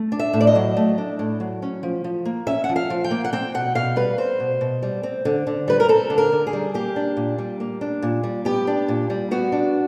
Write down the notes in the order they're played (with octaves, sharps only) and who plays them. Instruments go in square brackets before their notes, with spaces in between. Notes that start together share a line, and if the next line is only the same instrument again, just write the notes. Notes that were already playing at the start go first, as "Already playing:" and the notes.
Already playing: [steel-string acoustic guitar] A3
D4
E5
A2
D5
D#5
F#3
A3
D4
A2
F#3
C#4
F3
F3
A#3
C#4 E5
F#5
F3
F5
F3
G5
A#3
F#5
C4 G5
B2 F#5
B2 F5
G3 B4
C4 C5
B2
B2
G3
C4
D3
D3
G3 B4
A#4
C4 A4
D3
A#4
D3
G#4
G3
A#3 G4
D4
A#2
G3
A#3
D4
A#2
G3
B3 G4
D4
A#2
G3
B3 F#4
D4